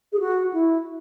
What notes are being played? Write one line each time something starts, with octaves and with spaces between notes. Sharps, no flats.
G#4
F#4
E4